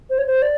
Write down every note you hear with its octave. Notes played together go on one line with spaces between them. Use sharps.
C5
C#5
C5
D5